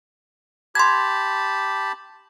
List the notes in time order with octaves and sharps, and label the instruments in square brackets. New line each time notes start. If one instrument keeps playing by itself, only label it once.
[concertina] G4 A5 B5 [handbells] C6 G#6